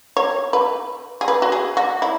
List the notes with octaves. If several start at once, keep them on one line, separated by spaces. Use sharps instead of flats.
C#5
B4
G#4
B4
F#4
G#4
F#4
E4